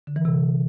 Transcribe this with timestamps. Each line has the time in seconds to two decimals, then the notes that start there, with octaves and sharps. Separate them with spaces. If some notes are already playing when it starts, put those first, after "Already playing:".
0.07 D3
0.16 E3
0.25 C3